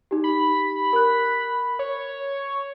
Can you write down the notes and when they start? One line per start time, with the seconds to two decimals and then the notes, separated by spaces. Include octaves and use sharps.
0.11 D#4 G4
0.24 B5
0.93 A#4 F#6
1.79 C#5